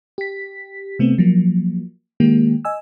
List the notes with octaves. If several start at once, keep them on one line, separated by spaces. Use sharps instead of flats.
G4 B6
C3 A3 B3 C4
F3 F#3 A#3
D#3 G#3 A#3 G4
D#5 G#5 E6